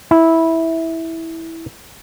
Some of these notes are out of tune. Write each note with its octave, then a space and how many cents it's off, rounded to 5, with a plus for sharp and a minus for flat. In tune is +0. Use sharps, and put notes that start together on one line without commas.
E4 -10